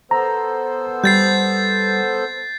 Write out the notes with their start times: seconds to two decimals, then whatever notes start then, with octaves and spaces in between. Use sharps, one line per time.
0.11 B3 A4 C5 A#5
1.04 G3 G6 A6 C7